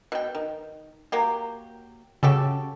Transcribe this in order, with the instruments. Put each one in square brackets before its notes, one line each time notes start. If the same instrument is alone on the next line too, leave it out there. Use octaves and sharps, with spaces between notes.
[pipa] B2 G5
D#3
F#3 A#3 G4
[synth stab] C#3 [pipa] F#4 G4 A4